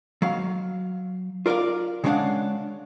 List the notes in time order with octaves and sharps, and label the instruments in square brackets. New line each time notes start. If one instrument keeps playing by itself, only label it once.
[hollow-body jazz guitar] F#3 F5
F4 A#4 D5 E5 F5
C#3 G#3 C#4 D4 F5 F#5